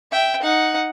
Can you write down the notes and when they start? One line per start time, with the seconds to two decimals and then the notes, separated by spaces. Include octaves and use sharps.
0.12 E5 G5
0.42 D#4 F#5